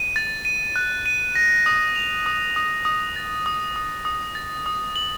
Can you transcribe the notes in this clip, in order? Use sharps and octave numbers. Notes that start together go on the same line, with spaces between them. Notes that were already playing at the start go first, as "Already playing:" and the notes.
Already playing: D#7
A6
D#7
F#6
D#7
A#6
D#6
F7
D#6
D#6
D#6
A6
D#6
D#6
D#6
A6
D#6
F#7